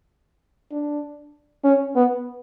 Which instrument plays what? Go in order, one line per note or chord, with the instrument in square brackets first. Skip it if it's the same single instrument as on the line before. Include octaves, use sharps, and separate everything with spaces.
[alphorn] D4
C#4
B3